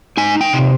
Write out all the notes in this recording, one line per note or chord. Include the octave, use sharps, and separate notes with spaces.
D#4 G#5
G5
C3